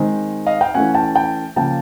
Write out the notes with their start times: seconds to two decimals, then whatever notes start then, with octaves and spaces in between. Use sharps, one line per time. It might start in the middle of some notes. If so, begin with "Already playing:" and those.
Already playing: D#3 G#3 C4
0.46 D#5 F5
0.61 F5 G5
0.74 E3 A3 C#4 F#5 G#5
0.94 G5 A5
1.15 G5 A5
1.56 C#3 F3 A#3 C#4 G5 A5